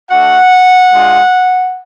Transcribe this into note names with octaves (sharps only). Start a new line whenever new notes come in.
A3 D4 F#4 F#5
G#3 D4 F4